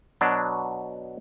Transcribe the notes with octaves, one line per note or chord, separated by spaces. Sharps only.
B2 F#3 D4